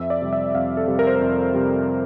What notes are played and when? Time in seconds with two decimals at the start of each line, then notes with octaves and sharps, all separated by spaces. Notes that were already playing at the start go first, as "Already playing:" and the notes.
Already playing: F2 E5
0.10 D5
0.21 C3 G3
0.33 E5
0.55 F2 F5
0.77 A4
0.88 C3 G3
0.99 A#4
1.07 C5
1.16 A#4
1.21 F2
1.54 C3 G3